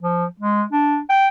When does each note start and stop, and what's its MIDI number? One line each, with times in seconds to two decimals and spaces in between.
0.03 0.25 53
0.40 0.63 56
0.72 0.99 62
1.10 1.28 79